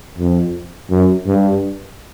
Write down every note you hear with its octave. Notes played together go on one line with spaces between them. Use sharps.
F2
F#2
G2